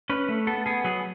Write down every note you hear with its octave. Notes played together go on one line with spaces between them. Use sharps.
C#4 B4
A3
B3 A4
B3 G#4
F#3 G#4